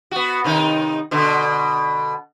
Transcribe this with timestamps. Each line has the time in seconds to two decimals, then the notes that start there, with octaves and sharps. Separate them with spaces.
0.11 B3 F#4
0.44 C3 D#3 D#4
1.11 B2 D3